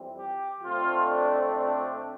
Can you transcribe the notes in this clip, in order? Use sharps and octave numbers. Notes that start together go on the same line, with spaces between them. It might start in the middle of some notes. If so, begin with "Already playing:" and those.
Already playing: F2 E3 G3 C4
G4
F2 D3 A3 C4 F4
D4
D4